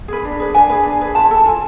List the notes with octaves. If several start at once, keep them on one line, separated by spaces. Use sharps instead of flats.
G#4 B4
D4
G#4 B4
D4 G#5
G#4 B4
D4
G#4 B4
F4 A5
A4 A5
F4 G#5